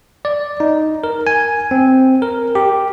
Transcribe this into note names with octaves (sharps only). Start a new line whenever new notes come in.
D5
D#4
A#4
G#5
C4
A#4
G4